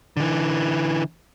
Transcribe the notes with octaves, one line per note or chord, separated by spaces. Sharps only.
D3 E3